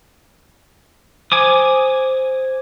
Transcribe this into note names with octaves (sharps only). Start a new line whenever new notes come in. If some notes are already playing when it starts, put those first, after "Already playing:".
C5 G#5 D6 D#6